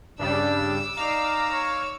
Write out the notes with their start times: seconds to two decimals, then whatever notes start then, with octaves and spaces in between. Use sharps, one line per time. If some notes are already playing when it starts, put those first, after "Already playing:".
0.19 G2 C#3 G3 D4 D6 E6
0.97 D#4 D5 F5 A#5
1.51 C#5